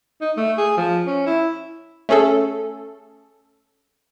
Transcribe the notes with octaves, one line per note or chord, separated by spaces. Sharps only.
D#4
A3
G#4
F3
C#4
E4
A3 C#4 G#4 A4